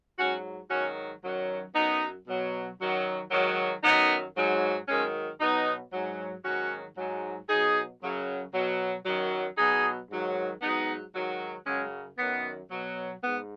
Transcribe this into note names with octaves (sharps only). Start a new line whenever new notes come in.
G#2 F#3 C#4 F#4
G#2 D#3 F#3 C#4 F#4
F#2 D#3 F#3
F#2 F#3 B3 D#4
B2 F#3
F#2 D#3 F#3
G#2 D#3 F#3
F#2 D#3 F#3 B3 D#4
G#2 F#3
G#2 D#3 F#3 G#3 C#4
B2 F#3 B3 D#4
G#2 F#3
G#2 D#3 F#3 C#4 F#4
G#2 F#3
B2 F#3 D#4 G#4
F#2 C#3 F#3
B2 F#3
F#2 D#3 F#3
B2 F#3 D#4 G#4
G#2 D#3 F#3
G#2 F#3 B3 D#4
G#2 D#3 F#3
F#2 C#3 F#3 G#3 C#4
F#2 D#3 F#3 B3
B2 F#3
G#2 B3